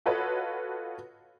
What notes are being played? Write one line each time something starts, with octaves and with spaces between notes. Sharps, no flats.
F4 F#4 A4 B4 C#5 D#5